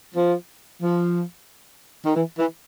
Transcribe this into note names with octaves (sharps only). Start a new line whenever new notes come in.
F3
F3
D#3
E3
E3